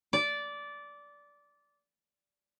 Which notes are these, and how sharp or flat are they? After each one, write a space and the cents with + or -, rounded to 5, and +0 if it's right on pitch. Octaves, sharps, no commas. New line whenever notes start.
D5 -15